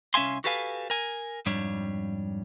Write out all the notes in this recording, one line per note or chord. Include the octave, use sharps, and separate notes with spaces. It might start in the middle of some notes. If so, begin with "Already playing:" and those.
C2 C#4 E5 F5 G#5 C6
F#4 G4 A4 B4 F5 G#5
A#4 G#5
F2 G#2 G3 D4 C#5